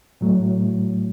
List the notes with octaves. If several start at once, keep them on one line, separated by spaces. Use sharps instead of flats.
A2 F#3 A3